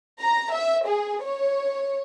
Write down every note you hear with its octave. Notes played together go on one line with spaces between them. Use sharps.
A#5
E5
G#4
C#5